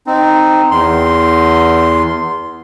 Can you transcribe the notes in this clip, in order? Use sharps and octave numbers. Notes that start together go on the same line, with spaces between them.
C4 D#4
E2 C6